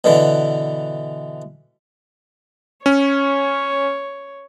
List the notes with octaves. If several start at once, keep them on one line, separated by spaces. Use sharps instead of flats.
B2 D3 E3
C#4 C#5